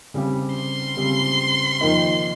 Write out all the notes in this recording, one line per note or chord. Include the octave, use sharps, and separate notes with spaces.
C#3 G3 C4 G4
C6
C#3 G3 C4 G4
F2 D#3 A#3 D#4